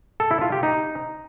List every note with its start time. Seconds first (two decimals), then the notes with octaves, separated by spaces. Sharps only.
0.20 A4
0.31 E4
0.41 F4
0.52 G4
0.63 D#4